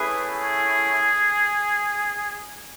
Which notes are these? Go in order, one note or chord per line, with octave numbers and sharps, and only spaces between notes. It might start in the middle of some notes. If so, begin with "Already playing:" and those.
Already playing: A3 C#4 E4 G#4 B4
G#4